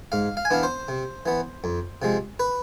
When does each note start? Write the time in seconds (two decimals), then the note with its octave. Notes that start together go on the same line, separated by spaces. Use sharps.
0.12 G#2 F5
0.37 F5
0.45 G#5
0.50 E3 B3 D4 F5
0.63 C5
0.88 C3
1.26 E3 B3
1.64 F2
2.02 C3 F3 G#3
2.40 B4